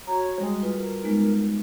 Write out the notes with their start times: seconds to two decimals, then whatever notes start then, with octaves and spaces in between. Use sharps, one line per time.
0.07 F#4 C#5 A#5
0.40 G3 G#3
0.62 F4 B4
0.77 A#4
1.03 G#3 B3 D#4